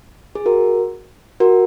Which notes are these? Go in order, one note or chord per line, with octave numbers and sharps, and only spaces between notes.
G#4
F#4 A#4
F#4 A#4